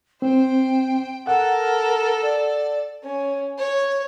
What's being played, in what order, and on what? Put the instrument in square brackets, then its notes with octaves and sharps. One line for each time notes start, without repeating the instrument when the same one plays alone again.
[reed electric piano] C4 [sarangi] C5 [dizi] G5
[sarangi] A4 [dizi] A#4 [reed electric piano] F#5
[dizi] D5
[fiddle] C#4
C#5